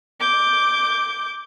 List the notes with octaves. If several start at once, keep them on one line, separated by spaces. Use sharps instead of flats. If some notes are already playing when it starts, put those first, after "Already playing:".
D6 G6